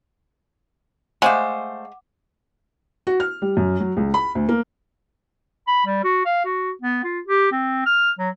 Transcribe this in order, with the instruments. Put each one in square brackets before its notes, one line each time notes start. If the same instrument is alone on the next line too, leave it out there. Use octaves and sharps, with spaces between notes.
[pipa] G#3 [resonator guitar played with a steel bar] A3 C5 F5 [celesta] F#5 D6
[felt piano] F#4
F6
G3
F#2
F#3
C#2
B5
D2
A#3
[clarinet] B5
G3
F#4
F5
F#4
B3
F4
G4
C4
F6
F#3